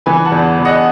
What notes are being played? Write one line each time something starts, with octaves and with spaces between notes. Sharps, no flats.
E3 G#5 B5
F#5 A5
E2
E2
D#5 F#5